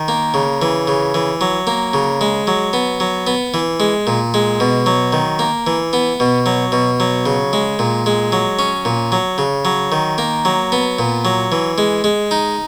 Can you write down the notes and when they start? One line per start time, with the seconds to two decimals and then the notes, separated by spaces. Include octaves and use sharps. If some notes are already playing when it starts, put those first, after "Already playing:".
Already playing: D#3
0.08 A#3
0.34 C#3
0.62 E3
0.87 C#3
1.14 E3
1.41 F#3
1.67 A#3
1.93 C#3
2.21 G#3
2.47 F#3
2.73 B3
3.00 F#3
3.27 B3
3.54 E3
3.80 G#3
4.07 A#2
4.34 G#3
4.60 B2
4.86 F#3
5.13 D#3
5.39 A#3
5.67 E3
5.93 B3
6.20 B2
6.46 F#3
6.72 B2
7.00 F#3
7.26 C#3
7.53 G#3
7.79 A#2
8.06 G#3
8.32 F#3
8.59 C#4
8.85 A#2
9.12 F#3
9.38 C#3
9.65 F#3
9.92 D#3
10.18 A#3
10.45 F#3
10.72 B3
10.99 A#2
11.25 F#3
11.52 E3
11.78 G#3
12.04 G#3
12.31 D#4